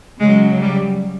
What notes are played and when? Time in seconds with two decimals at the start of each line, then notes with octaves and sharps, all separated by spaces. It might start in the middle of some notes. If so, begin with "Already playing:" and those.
0.20 C#3 F#3 G#3
0.60 G3